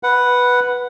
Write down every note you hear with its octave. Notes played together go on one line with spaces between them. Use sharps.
B4 F#5